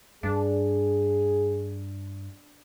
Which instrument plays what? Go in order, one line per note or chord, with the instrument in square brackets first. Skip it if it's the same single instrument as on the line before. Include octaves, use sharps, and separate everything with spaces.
[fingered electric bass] G2 [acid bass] D4 [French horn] G#4